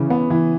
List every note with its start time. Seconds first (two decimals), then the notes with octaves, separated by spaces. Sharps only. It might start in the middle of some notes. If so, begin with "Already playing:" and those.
Already playing: C#3 E3
0.10 B3
0.30 E3